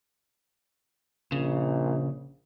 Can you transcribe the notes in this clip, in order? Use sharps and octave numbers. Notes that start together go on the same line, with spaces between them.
A#1 C#3